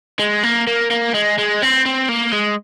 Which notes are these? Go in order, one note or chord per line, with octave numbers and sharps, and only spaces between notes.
G#3
A#3
A#3
A#3
G#3
G#3
C4
C4
A#3
G#3